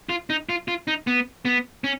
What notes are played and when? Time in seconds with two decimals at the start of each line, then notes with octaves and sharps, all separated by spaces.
0.09 F4
0.30 D#4
0.49 F4
0.68 F4
0.88 D#4
1.07 B3
1.45 B3
1.84 C#4